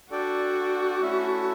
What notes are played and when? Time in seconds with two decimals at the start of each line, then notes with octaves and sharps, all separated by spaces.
0.11 D4 F#4 A4 D5 G5
1.01 A3 C#4 E4 A4 E5